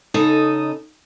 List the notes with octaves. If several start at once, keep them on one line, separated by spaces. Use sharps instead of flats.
C#3 D#4 A4 D#5